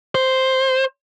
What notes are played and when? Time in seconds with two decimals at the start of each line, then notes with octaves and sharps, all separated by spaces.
0.15 C5